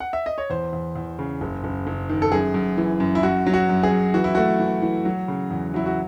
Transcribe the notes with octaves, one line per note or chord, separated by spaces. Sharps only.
F#5
E5
D#5
C#5
E2 C5
E2
E2
C#3
F#1
F#1
F#1
D#3
A4
F#2 G#4
F#2
E3
F#2
E4
F#2 F#4
F#3
F#4
F#2
G#4
F#2
E3 F#4
E4
A3 F#4
E3
E3
F#3
C#3
E2
F#3 E4
F#4